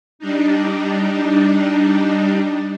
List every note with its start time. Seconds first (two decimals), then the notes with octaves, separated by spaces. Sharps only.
0.19 G3 D4 D#4